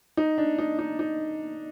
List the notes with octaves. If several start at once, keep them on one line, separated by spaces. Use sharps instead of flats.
D#4
D4
D#4
D#4
D#4